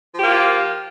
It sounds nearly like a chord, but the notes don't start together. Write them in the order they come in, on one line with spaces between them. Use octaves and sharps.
F3 G4 A#3 F4